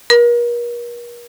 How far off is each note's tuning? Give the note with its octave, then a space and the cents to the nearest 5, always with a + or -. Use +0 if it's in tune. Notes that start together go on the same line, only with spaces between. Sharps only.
A#4 +40